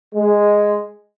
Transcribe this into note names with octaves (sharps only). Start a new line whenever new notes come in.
G#3